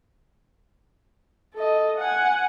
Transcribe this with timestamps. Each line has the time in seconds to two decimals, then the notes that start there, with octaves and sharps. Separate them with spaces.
1.54 A4 D#5
1.98 F#5 G#5